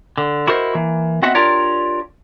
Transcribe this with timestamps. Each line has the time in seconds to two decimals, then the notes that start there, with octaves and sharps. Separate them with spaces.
0.18 D3
0.48 E4 F#4 A#4 C5 D5 D#5
0.75 E3 A#3
1.22 B3 C4 F#4 D#5 E5 F#5
1.35 D4 F4 G4 A#4 C#5 D5